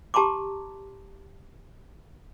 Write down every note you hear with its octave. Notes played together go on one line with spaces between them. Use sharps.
G4 A5 A#5 C6 D6